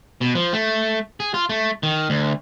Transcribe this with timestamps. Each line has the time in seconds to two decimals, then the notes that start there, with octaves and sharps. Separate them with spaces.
0.21 B2
0.35 F3
0.53 A3
1.20 G#4
1.34 F4
1.49 A3
1.83 D#3
2.10 D2